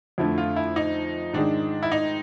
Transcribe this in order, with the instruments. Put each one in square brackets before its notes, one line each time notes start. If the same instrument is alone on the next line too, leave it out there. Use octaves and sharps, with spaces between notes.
[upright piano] F2 D3 F3 A3 [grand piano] E4
[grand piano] F4
E4
D#4
[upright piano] G#2 D#3 G#3 [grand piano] D4
[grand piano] E4
D#4